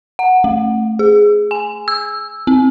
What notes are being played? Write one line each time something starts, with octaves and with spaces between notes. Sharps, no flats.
F#5
A3
G#4
G#5
E6
C4